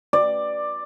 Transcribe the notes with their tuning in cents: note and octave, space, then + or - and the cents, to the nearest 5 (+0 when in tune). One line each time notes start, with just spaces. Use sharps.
D5 +10